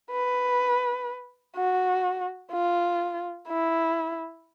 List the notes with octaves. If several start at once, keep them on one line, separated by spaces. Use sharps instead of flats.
B4
F#4
F4
E4